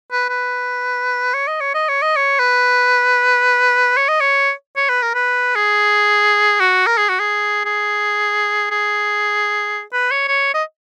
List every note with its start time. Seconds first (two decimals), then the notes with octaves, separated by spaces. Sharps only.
0.12 B4
0.29 B4
1.34 C#5
1.48 D#5
1.61 C#5
1.74 D#5
1.89 C#5
2.02 D#5
2.16 C#5
2.40 B4
3.97 C#5
4.09 D#5
4.20 C#5
4.77 C#5
4.90 B4
5.02 A#4
5.15 B4
5.56 G#4
6.60 F#4
6.87 A#4
6.98 G#4
7.09 F#4
7.20 G#4
7.66 G#4
8.71 G#4
9.93 B4
10.11 C#5
10.28 C#5
10.54 D#5